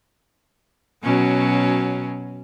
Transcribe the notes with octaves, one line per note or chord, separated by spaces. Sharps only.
B2 F#3 C#4